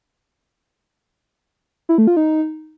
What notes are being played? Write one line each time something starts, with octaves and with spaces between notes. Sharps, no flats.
E4
A3
F4
D#4